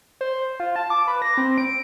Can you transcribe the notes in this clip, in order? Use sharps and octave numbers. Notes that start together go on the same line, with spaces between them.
C5
F4
A5
D6
B4
A#6
C4
D7